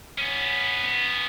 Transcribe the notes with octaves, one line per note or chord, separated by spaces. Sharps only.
B3 C#4